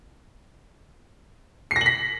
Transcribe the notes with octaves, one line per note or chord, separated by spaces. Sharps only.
C7
A#6
F#7
B6